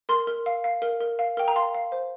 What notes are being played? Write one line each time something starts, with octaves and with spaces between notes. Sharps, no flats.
A#4 C6
A#4
F5
F5
A#4
A#4
F5
A#4 G5
A#5
F5 C6
F5
C5